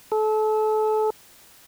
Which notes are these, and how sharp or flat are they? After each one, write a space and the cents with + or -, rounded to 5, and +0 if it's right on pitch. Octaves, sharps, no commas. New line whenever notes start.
A4 -30